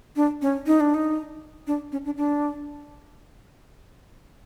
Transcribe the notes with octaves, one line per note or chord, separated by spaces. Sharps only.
D4
C#4
D#4
D4
D#4
D4
C#4
D4
D4